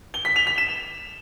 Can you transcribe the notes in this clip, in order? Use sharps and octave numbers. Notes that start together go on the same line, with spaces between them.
G7
B6
F7
B6
E7